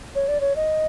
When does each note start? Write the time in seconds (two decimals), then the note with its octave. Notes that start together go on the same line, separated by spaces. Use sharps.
0.15 C#5
0.28 D5
0.41 C#5
0.56 D#5